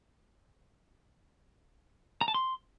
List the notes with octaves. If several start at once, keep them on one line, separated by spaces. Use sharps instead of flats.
A#5
A5
C6